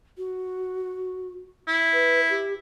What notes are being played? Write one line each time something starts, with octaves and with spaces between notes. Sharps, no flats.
F#4
E4
B4
G4